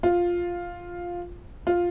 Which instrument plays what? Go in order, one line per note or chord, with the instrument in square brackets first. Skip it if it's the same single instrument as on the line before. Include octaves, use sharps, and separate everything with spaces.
[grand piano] F4
F4